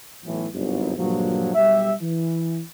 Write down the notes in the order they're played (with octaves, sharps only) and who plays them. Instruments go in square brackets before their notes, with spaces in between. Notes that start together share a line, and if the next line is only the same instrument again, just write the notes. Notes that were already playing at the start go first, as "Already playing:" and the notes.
[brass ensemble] B1 A2 E3
G1 C2 F#2
G2 A#2 D3 F3 F#3
B1 G3 G4 E5
E3